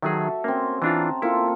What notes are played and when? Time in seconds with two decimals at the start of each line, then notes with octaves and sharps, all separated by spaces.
0.02 D#3 F#3 F#4 G#4 A4 E5
0.44 A#3 C4 C#4
0.82 E3 D4 F4 A5 A#5
1.22 A#3 E4 F4 A4